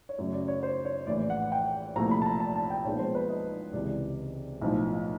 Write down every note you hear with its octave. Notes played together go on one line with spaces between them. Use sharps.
C#5
F#2 C#3 F#3 A3 C#4 D5
D5
C#5
C5
C#5
A#1 A2 E3 D5
F#5
G5
C2 A#2 F3 A3 A#5
B5
A5
A#5
A5
A5
G5
B1 A#2 F3 G#3 B3 C#5
C5
B4
D#5
C#2 C3 E3 D5
B1 A2 F3